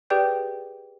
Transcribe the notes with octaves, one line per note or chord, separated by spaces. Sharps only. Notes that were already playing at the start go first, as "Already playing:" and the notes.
G4 G#4 B4 D5 G5 G6